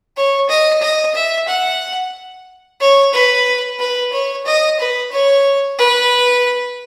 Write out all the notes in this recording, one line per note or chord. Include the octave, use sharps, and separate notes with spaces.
C#5
D#5
D#5
E5
F#5
C#5
B4
B4
C#5
D#5
B4
C#5
B4